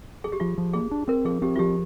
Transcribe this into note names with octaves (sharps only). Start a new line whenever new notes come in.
G#4
G4
F3 F4
F3
A#3 G#4
D4
C4 A#4
F3 G#4
C4 G4
F4
F3 G4